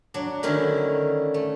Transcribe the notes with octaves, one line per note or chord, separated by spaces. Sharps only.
F#3 D4
D3 D#3 C#4 E4
A3